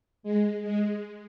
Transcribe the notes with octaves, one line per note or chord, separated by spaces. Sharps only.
G#3
G#3